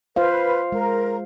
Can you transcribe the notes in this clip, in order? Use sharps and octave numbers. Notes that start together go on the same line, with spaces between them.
F4 B4 C5 F5
G#3 A#4